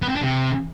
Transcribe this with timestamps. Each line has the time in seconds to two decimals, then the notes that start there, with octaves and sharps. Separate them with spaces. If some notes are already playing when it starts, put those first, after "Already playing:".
0.02 B3
0.09 C4
0.16 D4
0.23 C3